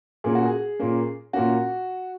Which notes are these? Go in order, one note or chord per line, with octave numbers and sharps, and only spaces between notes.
A#2 A#3 C#4 G#4
F#4
G#4
A#2 A#3 C#4
A#2 A#3 C#4 F#4